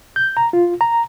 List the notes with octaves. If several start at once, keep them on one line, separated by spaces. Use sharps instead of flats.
G6
A#5
F4
A#5